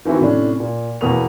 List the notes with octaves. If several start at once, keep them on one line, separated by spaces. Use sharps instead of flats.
D#3 E3 C4 E4 F#4
A2 C3 C#4 D4
A#2
E2 B2 A#3 D#6 F7